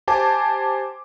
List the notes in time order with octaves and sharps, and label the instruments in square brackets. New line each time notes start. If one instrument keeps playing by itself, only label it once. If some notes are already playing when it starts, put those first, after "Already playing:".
[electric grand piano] G4 C5 G#5 A5 D6